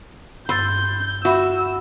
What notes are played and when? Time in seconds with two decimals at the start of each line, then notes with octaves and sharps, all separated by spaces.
0.49 G2 C6 E6 G6 A6
1.25 F#4 E5 B5 E6